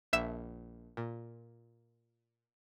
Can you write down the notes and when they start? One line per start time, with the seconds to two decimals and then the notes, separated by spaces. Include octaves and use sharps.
0.13 A#1 E5 E7
0.97 A#2